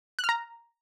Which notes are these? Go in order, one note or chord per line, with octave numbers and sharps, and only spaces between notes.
F#6
F6
A#5